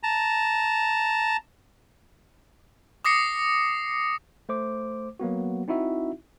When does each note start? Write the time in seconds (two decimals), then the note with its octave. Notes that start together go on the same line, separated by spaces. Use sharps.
0.03 A5 A#5
3.05 D6 D#6 A#6 C7 C#7
4.49 A3 C5 D6
5.20 F#3 A#3 B3 F#4
5.68 C4 D#4 E4 F#4 E5